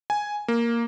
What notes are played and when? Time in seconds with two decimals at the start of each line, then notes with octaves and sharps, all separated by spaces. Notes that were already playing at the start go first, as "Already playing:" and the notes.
0.10 G#5
0.48 A#3